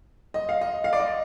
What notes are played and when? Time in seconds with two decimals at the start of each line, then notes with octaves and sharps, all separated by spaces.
0.34 D#5
0.49 F5
0.61 D#5
0.84 F5
0.93 D5
1.00 D#5